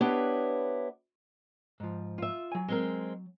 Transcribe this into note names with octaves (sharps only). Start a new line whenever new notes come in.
B3 D4 E4 G4 B4 C#5
G#2 F3
F4 E5
F#3 G#5
G#3 C4 A#4